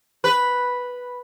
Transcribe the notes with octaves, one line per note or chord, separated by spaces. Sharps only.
B4